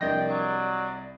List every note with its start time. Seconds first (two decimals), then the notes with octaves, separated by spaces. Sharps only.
0.01 C2 F3 D4 A#4 D5 D#5 G5 A#6
0.30 F#3 D#6